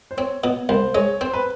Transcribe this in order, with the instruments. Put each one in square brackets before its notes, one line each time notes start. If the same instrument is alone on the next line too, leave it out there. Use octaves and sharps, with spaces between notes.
[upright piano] C5
[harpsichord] C4 [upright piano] C#5
[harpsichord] B2
[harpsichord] C2 [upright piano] C5
[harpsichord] G#3 [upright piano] C#5
[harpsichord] C4 [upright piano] C5
[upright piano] B4